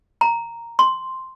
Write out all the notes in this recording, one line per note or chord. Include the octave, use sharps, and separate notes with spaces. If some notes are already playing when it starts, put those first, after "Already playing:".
A#5
C6